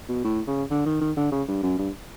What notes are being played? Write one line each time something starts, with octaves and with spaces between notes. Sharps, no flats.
B2
A2
C#3
D3
D#3
D#3
D3
C#3
G2
F#2
G2